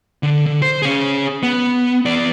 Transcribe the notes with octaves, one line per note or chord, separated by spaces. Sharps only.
D3
D3
C5
C#4 G#4
B3
E2 D5